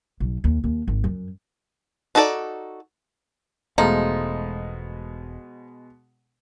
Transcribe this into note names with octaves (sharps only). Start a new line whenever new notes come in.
B1
D#2
D#2
G#1
F#2
D4 D#4 F#4 A4 D5
E1 B2 F3 G#3 A3 D#4